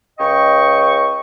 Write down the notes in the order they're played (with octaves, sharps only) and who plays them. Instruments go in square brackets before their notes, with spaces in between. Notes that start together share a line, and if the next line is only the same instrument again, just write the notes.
[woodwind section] C#2 C#3 D#5 G5 C#6